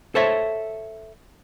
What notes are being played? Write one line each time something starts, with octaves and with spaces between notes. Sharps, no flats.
A4 C5 C#5 E5